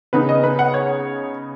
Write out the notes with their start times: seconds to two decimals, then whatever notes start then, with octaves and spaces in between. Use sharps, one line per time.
0.13 C#3 B3 D#4 B4
0.29 D#5
0.43 B4
0.59 F#5
0.74 C#5